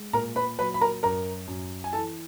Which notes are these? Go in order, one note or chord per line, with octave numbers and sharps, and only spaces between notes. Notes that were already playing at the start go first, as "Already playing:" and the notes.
Already playing: G#3
A#2 A#4 A#5
B4 B5
F#3 B4 B5
B5
A#4 A#5
F#2 A#4 A#5
F#2
G#5
E3 A4 A5